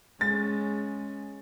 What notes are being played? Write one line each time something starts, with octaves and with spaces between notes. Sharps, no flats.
G#3 C#4 A6